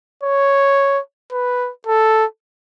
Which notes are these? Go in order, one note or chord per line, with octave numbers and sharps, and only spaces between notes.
C#5
B4
A4